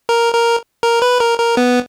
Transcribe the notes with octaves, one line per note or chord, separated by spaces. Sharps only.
A#4
A#4
A#4
B4
A#4
A#4
B3